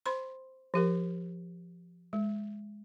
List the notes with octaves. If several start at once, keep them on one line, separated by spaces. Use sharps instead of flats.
C5 B5 C6
F3 G4 A#4
G#3